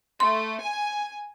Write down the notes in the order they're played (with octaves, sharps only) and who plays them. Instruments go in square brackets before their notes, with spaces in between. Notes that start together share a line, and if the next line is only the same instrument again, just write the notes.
[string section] A3 [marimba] C6
[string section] G#5